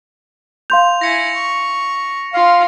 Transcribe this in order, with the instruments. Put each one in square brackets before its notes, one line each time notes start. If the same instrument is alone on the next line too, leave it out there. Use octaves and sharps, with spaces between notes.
[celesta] F5 C6 G6 [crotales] F7
[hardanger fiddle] E4 G#5 [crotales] A#6 C#7
[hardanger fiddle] C#6
[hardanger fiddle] F4 [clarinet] F5